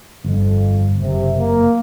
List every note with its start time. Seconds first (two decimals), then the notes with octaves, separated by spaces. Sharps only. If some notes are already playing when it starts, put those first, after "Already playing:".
0.24 G1 F2
1.00 F#1 C3
1.38 A#3